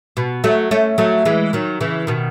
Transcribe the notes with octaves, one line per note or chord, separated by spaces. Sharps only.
B2
F#3 A3
A3 C#4
F#3 A3
E3 G#3
D#3 F#3
C#3 E3
B2 D#3